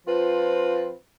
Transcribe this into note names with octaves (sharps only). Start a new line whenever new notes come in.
F3 C4 F4 B4